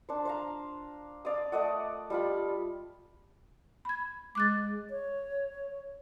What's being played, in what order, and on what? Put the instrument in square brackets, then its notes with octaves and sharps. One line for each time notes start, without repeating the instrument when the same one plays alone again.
[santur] D4 C5
C5 F5 A#5
D5 F5 D#6
A3 D5 D#5 F#5
G3 F4 B5
[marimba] B5 G#6
[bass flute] G#3 [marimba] D6 F#6 A6
[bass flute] C#5